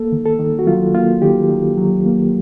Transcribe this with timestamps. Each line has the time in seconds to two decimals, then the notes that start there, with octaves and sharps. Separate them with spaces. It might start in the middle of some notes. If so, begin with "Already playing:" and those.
Already playing: A#3 A4
0.12 D#3
0.26 A4
0.39 D#3
0.59 F#4
0.67 F#3 F4
0.94 A#3 F4
1.22 D#3 G4
1.49 D#3
1.78 F#3
2.06 A#3